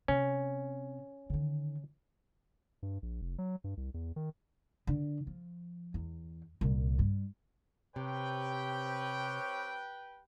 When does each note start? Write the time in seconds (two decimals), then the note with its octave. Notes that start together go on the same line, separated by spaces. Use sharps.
0.08 C3 C#4
1.30 D3 D#3
2.83 G2
3.02 A#1
3.22 F1
3.38 F#3
3.64 G2
3.77 C2
3.94 E2
4.16 D#3
4.87 D3
5.27 F3
5.94 E2
6.61 C2 A#2
6.99 G2
7.96 C3 C4 G4 B4 C#5 G5